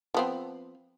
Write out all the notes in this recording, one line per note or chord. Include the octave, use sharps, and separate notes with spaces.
F3 B3 C4